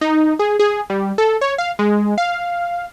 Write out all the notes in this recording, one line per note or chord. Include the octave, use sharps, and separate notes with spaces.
D#4
G#4
G#4
G3
A4
C#5
F5
G#3
F5